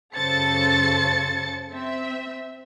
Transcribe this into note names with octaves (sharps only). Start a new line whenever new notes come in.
F#2 C#3 A4 C5 A6 C#7
C4 E5